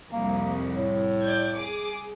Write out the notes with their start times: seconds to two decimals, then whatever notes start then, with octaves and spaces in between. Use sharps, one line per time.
0.13 C2 F2 A#3
0.74 A2
1.23 D5 G6 G#6
1.56 G#4 D6